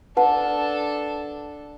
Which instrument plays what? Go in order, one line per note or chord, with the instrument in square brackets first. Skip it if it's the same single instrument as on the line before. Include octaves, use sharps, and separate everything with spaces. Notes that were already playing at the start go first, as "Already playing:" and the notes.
[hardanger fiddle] D4 A4 [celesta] B4 F#5 A5